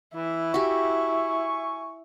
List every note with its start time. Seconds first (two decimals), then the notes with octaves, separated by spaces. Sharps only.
0.15 E3 E4
0.54 F#4 G4 E5 G#5 C#6